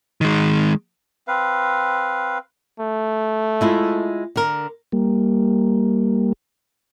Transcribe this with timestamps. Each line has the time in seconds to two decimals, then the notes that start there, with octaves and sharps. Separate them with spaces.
0.21 D#3 G#3
1.28 C4 B4 F5
2.80 A3
3.61 G#3 E4 F4
4.36 D3 A#4
4.92 G3 A#3